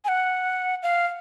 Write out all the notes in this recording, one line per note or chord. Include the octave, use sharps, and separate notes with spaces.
G#5
F#5
F5